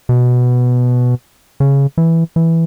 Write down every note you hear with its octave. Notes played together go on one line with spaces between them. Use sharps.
B2
C#3
E3
E3